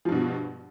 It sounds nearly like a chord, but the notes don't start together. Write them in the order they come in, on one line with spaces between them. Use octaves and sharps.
F3 G2 B2